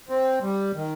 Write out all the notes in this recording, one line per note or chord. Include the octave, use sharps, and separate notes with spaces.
C4
G3
D#3